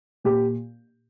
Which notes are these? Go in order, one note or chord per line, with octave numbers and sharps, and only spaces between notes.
A#2 G4